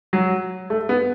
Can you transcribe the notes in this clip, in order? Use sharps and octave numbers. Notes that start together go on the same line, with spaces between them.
F#3
A3
B3